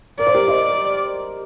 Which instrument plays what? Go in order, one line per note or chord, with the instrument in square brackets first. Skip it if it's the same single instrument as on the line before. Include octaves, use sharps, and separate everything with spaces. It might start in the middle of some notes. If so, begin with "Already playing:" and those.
[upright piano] A#4 [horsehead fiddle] D5
[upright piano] C5
G4 A#4
C5 D#5